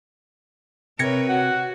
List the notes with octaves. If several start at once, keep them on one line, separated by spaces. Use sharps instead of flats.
C3 A#4 B4 C#5 G#6 A#6 C#7
F#4 F#5